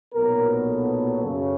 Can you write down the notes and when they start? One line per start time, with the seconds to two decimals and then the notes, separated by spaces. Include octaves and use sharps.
0.14 B1 A#2 F#3 B3 A#4
0.67 A4
1.21 F#2 C#3 F#3